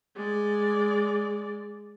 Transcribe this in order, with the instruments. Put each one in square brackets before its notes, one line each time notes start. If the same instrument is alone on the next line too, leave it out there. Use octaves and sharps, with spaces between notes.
[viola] G#3 D5